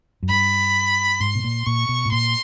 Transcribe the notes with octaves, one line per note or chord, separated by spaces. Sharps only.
F#2
G2 B5
G#2 C6
B2
A#2
A#2 C#6
B2
A2
A#2 C6